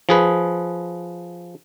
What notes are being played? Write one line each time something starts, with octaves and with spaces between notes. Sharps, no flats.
F3 G#4 B4